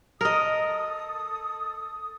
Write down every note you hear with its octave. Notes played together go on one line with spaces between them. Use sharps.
A4 A#4 D#5 D#6